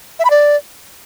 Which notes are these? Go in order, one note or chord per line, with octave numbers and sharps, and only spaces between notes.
E5
B5
D5